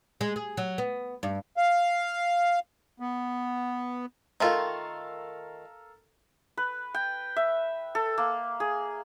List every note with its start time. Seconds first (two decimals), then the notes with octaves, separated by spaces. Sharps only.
0.21 G#3
0.36 G#4
0.57 F#3
0.78 B3
1.23 G2
1.57 F5
3.00 B3
4.40 D#3 A3 F4 A4 A#4 F5
6.57 B4
6.94 G5
7.36 E5
7.95 A4
8.18 A#3
8.60 G#4